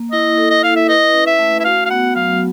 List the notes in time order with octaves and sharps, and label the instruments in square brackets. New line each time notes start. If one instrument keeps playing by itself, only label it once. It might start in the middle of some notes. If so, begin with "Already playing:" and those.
Already playing: [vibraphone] A#3
[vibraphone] E4 [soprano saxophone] D#5
[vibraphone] A4
[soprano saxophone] D#5
[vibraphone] E4 [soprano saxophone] F5
[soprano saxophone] E5
[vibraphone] B4 [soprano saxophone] D#5
[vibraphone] C#4
[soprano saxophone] E5
[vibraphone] A3
[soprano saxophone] E5
[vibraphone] F#4 [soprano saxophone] F5
[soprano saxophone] F5
[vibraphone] B3 [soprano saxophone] F#5
[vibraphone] F#3 [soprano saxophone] F5